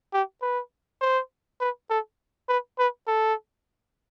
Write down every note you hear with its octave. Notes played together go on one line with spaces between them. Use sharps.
G4
B4
C5
B4
A4
B4
B4
A4